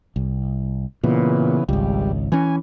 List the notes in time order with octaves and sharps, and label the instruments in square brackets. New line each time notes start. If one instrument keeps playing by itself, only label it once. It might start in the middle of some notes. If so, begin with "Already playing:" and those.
[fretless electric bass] C2
[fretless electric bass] A#2 [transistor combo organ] C#3 E3 B3
[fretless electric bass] G#1 C#2 [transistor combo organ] G3
[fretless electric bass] E3 C#4 [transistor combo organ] G#5